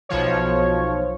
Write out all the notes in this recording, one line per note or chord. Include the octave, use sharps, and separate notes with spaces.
B1 B2 F3 C#5